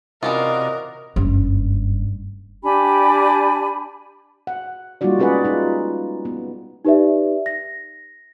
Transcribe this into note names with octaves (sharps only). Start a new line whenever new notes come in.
C3 E3 C#4 F4 F#4 A#4 D5 D#5
F#1 G2
D4 G4 G#5 B5
F#5
G3 A#3 D#4 F4 F#4 D5
G#3 C#4 G#4 B4 D5 F#5
D#4 F4
B3
D#4 G4 B4 D5 E5
A#6